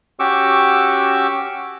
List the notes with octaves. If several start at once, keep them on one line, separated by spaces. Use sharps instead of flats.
C#4 F#4 G4 C#6 D6 E6